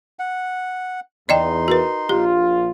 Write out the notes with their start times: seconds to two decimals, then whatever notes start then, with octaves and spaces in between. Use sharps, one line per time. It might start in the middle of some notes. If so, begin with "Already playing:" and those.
0.19 F#5
1.29 E2 D#4 D5 D#5 G5 C6
1.68 F#4 A#4 B4
2.09 A#1 F4 G4